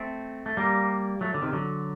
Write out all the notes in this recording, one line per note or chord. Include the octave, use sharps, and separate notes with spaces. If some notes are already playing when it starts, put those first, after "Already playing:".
Already playing: A3 C4
A3
G3 A#3
F#3 A3
D3
C3 D#3
D3 F#3